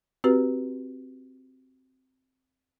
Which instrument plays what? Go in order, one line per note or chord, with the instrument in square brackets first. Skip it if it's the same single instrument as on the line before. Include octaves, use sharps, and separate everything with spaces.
[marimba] C4 F#4 G4 B4